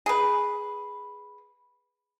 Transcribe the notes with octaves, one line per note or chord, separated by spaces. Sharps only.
G#4 B4